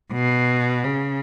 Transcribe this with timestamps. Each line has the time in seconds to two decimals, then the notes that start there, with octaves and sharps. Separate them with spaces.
0.12 B2
0.84 C#3